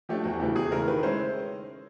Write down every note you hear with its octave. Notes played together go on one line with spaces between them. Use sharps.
F3 A3 D4 G4
E2 F#4
C#3 E3 A3 G4
E2 G#4
C#3 E3 A3 A#4
D#3 B4
G#3 C#4 E4 C5